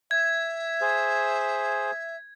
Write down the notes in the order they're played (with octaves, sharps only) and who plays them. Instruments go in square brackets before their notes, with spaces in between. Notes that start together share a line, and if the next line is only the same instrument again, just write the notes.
[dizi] E5 [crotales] G#6
[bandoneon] G#4 C5